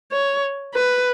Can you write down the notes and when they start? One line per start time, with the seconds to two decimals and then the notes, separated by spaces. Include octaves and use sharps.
0.12 C#5
0.74 B4